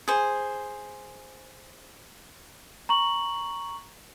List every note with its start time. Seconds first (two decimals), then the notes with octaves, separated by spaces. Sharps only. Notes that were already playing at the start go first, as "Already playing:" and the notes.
0.08 G#4 C5
2.89 A#5 C#6 F#7